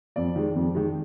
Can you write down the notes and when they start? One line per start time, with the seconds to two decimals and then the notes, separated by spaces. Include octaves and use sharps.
0.16 F2 D5
0.36 D#3 G#3
0.55 F2
0.75 D#3 G#3